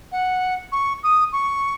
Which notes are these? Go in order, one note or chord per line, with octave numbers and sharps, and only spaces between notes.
F#5
C#6
D#6
C#6